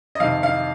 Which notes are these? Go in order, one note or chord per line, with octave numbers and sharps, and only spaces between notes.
D#5
F2 C3 D#3 F5
F5